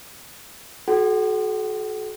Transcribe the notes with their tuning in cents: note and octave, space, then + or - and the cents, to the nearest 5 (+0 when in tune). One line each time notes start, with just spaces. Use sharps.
F#4 +0 A4 -40 F#5 +45